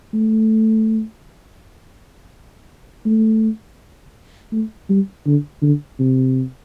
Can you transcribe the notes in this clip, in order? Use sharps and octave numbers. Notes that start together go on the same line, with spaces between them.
A3
A3
A3
G3
D3
D3
C3